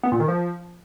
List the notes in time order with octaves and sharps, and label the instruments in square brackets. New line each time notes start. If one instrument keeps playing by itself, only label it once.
[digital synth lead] B3
A#2
D#3
F3